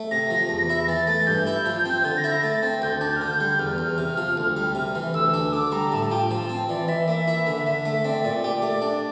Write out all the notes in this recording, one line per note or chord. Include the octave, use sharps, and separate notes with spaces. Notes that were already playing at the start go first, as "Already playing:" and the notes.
Already playing: A3
C3 A#6
F3
E2
E4
E3 A6
A3 A6
G2 G6
E4
F3
C4
D3 A6
A#6
E4
A#6
A3 A6
C4
D2 G6
D4 A6
G6
F6
D3 G6
G3
E2 F6
E2
C3
F3
D2
G3
C3
E3
D2 E6
D4
D3 D6
G3 A#5
A2 A5
A5
F4 G5
F3 A5
C4
E3 D5
E3 E5
A#3 E5
E4
D3
D3
A3 E5
C4 D5
A#2 D5
G4
A3
D4